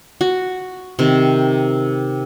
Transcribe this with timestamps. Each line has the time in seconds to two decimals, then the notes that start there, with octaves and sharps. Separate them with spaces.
0.21 F#4
0.99 C3 D#3